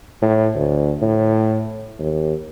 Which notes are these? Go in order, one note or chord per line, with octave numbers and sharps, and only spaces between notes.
A2
D2
A2
D#2